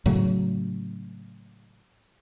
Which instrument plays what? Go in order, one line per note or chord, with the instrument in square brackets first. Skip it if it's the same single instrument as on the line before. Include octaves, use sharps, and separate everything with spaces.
[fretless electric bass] A2 C#3 F#3 A3